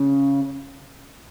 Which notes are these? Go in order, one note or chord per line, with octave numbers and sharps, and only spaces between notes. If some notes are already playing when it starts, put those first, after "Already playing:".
Already playing: C#3